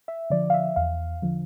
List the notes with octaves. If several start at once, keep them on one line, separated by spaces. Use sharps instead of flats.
E5
D3 F3 D5
F5
E5
E2 F5
D3 F3